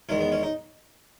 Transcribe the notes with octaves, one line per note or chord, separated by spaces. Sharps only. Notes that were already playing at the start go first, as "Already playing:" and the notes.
E2 D#3 G#3 C#4
B3
C#4
D#4